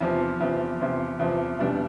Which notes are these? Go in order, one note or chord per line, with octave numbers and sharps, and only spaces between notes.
E2 C3 F3
E2 C3 F3
E2 C3 F3
E2 C3 F3
E2 B2 G3 D4